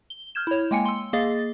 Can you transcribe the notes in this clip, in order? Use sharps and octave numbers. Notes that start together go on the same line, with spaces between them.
G7
F6 G6 G#6 E7
E4 C#5
G#3 A#3 G5 G#5 C#7
C6 E6
A#3 G#4 D#5 F5 A6